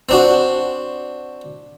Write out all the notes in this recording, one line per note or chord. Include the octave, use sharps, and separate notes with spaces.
C4 D4 F#4